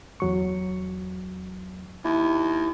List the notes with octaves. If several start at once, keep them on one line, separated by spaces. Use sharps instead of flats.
E2 F#3 C#6
D#2 E4